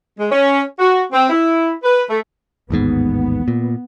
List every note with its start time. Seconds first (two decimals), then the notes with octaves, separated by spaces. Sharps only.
0.18 G#3
0.31 C#4
0.79 F#4
1.12 C4
1.29 E4
1.83 B4
2.09 A3
2.70 A1 D#2 G#2 B3
3.48 A#2